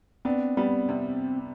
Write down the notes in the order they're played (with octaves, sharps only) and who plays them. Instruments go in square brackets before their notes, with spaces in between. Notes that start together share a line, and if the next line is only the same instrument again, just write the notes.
[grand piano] B3 D4 [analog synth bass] C4
[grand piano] G3 B3
C3